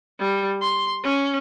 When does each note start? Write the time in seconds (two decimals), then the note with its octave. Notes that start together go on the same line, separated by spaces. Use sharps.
0.19 G3
0.62 C6
1.04 C#4